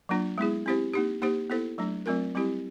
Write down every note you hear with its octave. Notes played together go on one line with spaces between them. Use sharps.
F#3 A#3 D4 F4
G#3 B3 E4 G#4
C4 E4 G4 C5
A#3 D#4 G4
A#3 D#4 G4 C5
B3 E4 A4 C5
F#3 A3 D4
F#3 A3 C4 F4 A#4
G3 C4 E4 G4